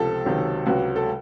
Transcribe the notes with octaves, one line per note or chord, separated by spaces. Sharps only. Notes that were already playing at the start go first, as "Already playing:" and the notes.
Already playing: C#2 C3 F3 A4
C#2 C3 D#3 F#3
C#2 C3 F#3 F#4
A4